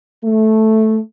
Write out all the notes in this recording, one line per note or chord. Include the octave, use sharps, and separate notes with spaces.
A3